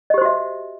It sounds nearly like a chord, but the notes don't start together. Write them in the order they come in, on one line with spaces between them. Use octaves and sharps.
D#5 G4 C5 F#4 E5